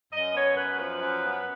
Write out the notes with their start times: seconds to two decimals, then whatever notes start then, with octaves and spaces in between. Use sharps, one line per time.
0.13 F#2 D#5
0.34 B3 C#5
0.57 F#2 B4
0.79 F3 B4
1.00 F#2
1.23 B3